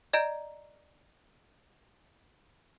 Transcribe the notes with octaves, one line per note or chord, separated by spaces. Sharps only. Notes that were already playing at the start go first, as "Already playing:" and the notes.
D5 D#5 A#5 G6 D7